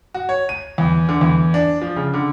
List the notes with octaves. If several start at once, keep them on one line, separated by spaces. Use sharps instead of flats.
F#4
C#5
D#7
E2
D3
E2
D4
F3
C#3
D3